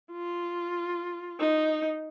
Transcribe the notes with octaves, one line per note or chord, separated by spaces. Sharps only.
F4
D#4